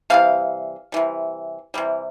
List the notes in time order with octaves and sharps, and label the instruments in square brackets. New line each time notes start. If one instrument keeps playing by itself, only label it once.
[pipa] C3 E3 G3 F5
C3 E3 G3
C3 E3 G3